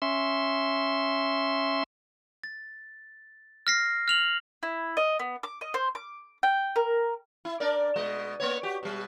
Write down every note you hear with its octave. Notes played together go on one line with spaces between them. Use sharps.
C#4 E5 C6
A6
F6 A#6 C7
F6 F7 F#7
E4
D#5
B3
D6
D#5
C5
D6
G5
A#4
E4
D4 A#4 D5
B2 G#3 D#5
A#3 B3 C#5
F#4 G4
B2 G3